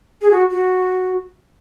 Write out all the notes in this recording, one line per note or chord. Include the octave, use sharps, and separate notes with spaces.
G#4
F#4
F#4